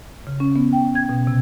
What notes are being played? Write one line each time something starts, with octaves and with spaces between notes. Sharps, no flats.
C#3
C#4
B3
G5
G#6
B2
C3